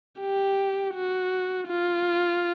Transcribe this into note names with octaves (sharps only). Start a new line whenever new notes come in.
G4
F#4
F4